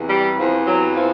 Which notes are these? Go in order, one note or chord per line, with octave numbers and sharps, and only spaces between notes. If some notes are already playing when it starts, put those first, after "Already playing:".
Already playing: E2 C3 E3
G3
E2 C3 E3 F3
F#3
F3